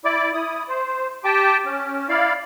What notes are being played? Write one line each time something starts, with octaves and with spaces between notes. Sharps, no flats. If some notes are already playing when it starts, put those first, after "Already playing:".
E4 D5 D6
E4 D#6
C5
G4 G5 A5 D6
C#4
E4 D5 F5